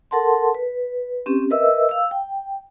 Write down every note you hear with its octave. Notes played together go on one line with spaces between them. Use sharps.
A4 A#4 F#5 A5 C6
B4
C4 C#4 G4
A#4 B4 D#5 E5 E6
F5 E6
G5